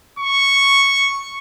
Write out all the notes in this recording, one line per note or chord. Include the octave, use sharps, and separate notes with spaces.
C#6